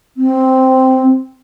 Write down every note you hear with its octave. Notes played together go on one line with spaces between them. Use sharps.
C4